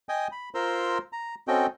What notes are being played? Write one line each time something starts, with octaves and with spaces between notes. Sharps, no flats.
D#5 G5 G#5 D#6
B5
F4 A#4 C5 A#5 C6 E6
A#5
C4 C#4 F#4 A4 D#5 G5